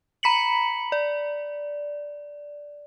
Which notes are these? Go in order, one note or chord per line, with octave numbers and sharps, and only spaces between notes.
A#5 B5 B6 C#7 F#7
D5